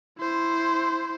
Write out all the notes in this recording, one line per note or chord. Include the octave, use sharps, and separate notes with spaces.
E4 C5